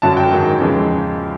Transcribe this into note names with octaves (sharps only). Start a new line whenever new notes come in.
F#2 D3 F#3 A5
G5
G#2 D#3 F#3
E2 C#3 F3 G#3